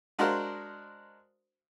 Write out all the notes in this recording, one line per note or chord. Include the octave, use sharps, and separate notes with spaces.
G#3 D4 F#4 A#4 C5 F5